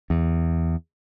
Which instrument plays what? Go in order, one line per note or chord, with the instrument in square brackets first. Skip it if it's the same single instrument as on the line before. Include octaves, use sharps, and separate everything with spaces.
[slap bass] E2